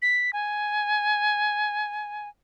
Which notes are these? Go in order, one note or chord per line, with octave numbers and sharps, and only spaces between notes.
B6
G#5